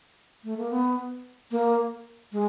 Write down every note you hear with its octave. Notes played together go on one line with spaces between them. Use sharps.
A3
A#3
B3
A#3
G#3